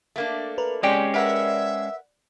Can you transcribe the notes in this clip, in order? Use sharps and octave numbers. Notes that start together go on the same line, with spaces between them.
A3 A#3 D4
A#4 B4
G#3 C4 C#4 G4 D5 G5
A#4 B4 E5 F#5